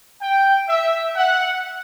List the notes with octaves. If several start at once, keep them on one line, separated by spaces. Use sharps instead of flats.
G5
E5
F#5